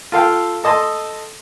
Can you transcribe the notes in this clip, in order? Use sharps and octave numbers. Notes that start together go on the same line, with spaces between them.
F4 A4 F5 G5
A4 D#5 A5 C6